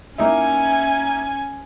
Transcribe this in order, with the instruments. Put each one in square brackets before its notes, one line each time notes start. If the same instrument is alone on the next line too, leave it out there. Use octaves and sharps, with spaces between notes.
[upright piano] A#3 D#4 E4 [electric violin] C#4 G#5